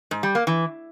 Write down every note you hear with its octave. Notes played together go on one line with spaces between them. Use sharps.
G#2
G3
A#3
E3